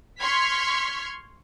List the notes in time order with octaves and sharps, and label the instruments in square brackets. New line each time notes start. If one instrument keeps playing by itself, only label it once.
[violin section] C6 C#6 F6 G#6 B6